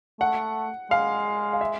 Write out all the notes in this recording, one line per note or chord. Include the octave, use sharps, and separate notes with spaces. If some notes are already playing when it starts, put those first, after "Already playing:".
A3 F#5
G#3 F5
F5
E5